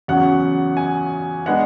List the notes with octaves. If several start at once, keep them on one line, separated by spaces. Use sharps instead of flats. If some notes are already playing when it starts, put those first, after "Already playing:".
E2 C#3 F#3 C#4 F#5
G#5
G#3 B3 D4 F#5